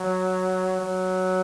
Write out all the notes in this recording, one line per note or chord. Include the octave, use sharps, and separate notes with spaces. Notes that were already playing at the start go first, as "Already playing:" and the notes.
Already playing: F#3
F#3